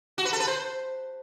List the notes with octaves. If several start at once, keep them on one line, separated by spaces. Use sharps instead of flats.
F#4
B4
A4
B4
C5